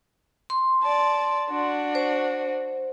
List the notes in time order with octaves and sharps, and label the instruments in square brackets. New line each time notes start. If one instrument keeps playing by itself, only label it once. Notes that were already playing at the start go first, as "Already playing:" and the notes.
[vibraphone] C6
[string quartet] D5 A5
D4 F#4
[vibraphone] C5